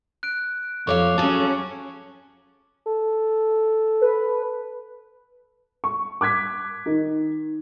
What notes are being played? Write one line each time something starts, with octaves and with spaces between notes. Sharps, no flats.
F#6 D7
F2 A4 C#5 F5 C#6 D6
F#3 C#4 G#4 A4 A5
A4
B4
C#6
D6 F#6 G#6 B6
D#3 D#4